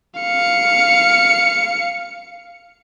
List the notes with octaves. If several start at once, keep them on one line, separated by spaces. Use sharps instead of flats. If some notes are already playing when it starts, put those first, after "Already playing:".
F5 C#7